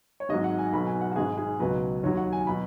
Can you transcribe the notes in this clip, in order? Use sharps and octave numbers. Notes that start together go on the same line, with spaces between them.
C#5
G#1 G#2 F#3 D#5
F#5
G#5
B1 B2 F#3 B5
G#5
F#5
F#4
G#1 G#2 D#3 G#4
G#4
C#2 B2 F#3 B4
D#2 D#3 F#3 C#5
F#5
G#5
B2 F#3 B5